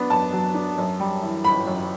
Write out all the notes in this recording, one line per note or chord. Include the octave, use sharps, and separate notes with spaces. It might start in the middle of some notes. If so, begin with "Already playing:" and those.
Already playing: F#3 B3 D4
F#2 A5
F#3
D4
F#2
G3
E3
G1 B5
F#2